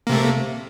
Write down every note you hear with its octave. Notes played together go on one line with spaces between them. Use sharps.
C3 A3 A#3